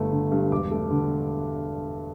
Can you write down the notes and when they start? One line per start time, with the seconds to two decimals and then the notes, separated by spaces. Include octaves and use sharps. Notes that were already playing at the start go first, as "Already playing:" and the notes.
Already playing: G1 A3
0.12 D3
0.32 G2
0.52 E1 D6
0.71 A3
0.91 D3